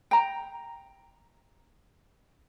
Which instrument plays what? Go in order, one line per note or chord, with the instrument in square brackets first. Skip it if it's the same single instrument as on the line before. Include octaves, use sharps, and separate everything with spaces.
[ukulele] G5 A#5